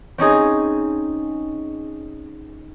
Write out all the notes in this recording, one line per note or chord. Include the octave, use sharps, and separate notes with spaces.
C4 C#4 D#4 G#4